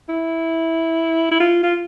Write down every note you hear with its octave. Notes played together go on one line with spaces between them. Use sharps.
E4
E4
F4
F4